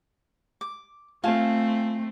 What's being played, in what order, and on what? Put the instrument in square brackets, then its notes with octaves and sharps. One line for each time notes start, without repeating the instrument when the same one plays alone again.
[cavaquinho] D6
[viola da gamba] A3 C4 [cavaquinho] F4 G#5 A5